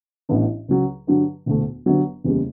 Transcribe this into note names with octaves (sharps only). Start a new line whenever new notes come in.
A1 A2 E3 B3 D4
C#2 C#3 F#3
G2 D3 F#3
E1 D2 D3 A3
G1 G2 D3 F#3
F#1 E2 C#3 G3